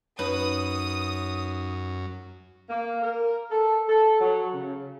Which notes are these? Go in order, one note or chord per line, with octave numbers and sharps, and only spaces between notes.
F#2 C#4 D#4 B4 C#5 D#6
A#3
A#4
A4
A4
F#3
C#3